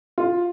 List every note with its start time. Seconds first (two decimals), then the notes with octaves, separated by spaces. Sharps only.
0.18 F4